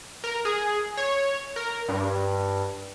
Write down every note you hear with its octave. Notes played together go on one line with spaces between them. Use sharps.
A#4
G#4
C#5
A#4
G2